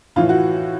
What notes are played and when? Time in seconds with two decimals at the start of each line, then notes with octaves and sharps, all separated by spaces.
0.16 A2 E3 F4
0.29 F#4